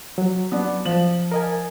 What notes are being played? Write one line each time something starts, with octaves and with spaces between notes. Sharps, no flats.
F#3
B3 D4
F3 F#7
A#4 D#5 G#5